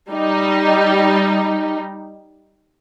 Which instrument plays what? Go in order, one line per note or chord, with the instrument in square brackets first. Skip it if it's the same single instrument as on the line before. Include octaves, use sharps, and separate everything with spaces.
[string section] G3 D#4